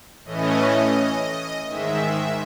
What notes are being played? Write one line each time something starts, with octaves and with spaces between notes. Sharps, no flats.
A2 E3 A3 C#4 D#5
G#2 D#3 G#3 E5